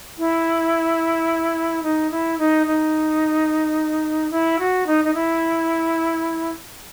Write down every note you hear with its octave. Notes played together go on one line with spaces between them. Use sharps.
E4
D#4
E4
D#4
D#4
E4
F#4
D#4
D#4
E4